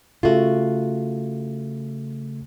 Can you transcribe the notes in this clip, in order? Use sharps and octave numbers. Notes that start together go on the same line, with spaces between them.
C#3 A3 F4 F#4